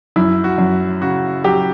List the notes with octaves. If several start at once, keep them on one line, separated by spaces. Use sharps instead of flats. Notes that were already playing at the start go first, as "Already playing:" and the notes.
F#2 E4
F#4
F#2
C#3 F#4
F#3 G4